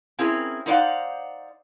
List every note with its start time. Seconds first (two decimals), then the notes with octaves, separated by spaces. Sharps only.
0.19 C4 C#4 E4 G#4 A#4
0.66 D#4 C5 D5 F5 F#5